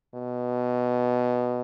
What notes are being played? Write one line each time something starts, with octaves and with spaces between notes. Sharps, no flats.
B2